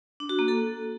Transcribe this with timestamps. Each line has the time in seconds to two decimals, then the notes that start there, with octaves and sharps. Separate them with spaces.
0.20 D4
0.29 F#4
0.39 A#3
0.48 A4